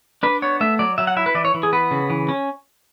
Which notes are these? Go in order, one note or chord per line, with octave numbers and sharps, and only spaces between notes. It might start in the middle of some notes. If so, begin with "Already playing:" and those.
D4 B4
B3 C#5
A3 E5
F#3 D5
F#3 E5
F#5
E4 E5
B4
E3 D5
C#5
E3
G#4
B3 B4
C#3
E3
C#4